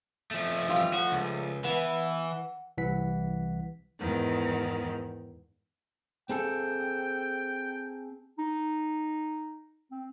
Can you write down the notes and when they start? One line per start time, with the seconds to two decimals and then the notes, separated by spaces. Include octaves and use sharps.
0.31 F3 A3
0.68 E3 G3 F4
0.93 F3 A3 F#4
1.12 C#2
1.64 E3 B3
2.77 C2 E3 F#5 B6
4.00 E2 G#2 D#3
6.30 C4 G#4 A4 G5
8.38 D#4
9.92 C4